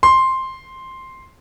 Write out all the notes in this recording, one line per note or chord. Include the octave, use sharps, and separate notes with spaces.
C6